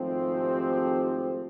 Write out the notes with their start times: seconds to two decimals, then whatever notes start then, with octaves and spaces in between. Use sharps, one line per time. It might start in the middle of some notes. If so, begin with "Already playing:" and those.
Already playing: G#1 G#2 F3 A3 C4
0.34 G4 A4